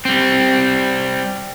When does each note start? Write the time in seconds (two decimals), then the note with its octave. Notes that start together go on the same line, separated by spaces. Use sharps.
0.05 G3 C4